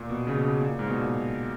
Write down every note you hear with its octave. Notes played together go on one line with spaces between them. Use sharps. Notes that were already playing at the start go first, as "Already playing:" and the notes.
Already playing: A#2
B2
C#3
B2
C#3
A#2
G#2
B2
A#2